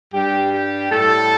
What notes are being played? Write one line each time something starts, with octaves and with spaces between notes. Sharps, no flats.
G2 G3 G4
G4
A2 G3 A4